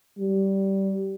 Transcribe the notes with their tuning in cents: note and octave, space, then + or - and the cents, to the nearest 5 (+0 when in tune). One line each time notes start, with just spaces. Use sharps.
G3 -15